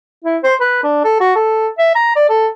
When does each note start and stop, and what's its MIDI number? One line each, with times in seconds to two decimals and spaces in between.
0.24 0.38 64
0.44 0.54 72
0.60 0.80 71
0.84 1.04 62
1.04 1.17 69
1.21 1.33 66
1.36 1.68 69
1.78 1.92 76
1.95 2.12 82
2.16 2.28 74
2.30 2.47 69